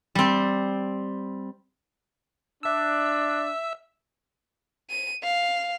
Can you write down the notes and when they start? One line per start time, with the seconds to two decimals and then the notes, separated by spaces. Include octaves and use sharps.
0.15 G3 C4
2.63 D4 E5 E6
4.90 D#7
5.23 F5